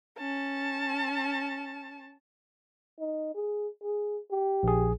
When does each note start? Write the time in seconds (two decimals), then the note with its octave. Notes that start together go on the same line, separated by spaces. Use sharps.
0.19 C#4 A5
2.99 D#4
3.35 G#4
3.83 G#4
4.31 G4
4.63 A#1 G#4